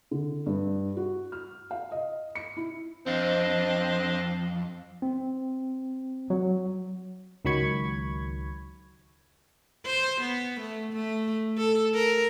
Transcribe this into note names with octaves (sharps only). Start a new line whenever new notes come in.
D3
G2
F#4
F6
F5
D#5
C#7
E4
F2 C4 D4 D#5 F5
C4
F#3
C#2 D#3 F#3 B5 C#6 G#6
C5
B3
A3
A3
A4
A#4